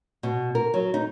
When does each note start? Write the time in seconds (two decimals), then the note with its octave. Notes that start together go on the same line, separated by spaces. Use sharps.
0.23 B2
0.55 A#4
0.74 F#3
0.94 D#4